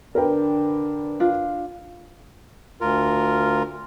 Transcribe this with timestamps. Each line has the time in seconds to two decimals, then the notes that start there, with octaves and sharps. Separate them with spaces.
0.15 D3 D4 A#4 B4 G5
1.20 D4 F4
2.81 D2 F4 A#4